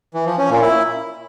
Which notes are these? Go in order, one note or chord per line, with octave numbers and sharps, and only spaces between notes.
E3
F3
C#4
A#2
E4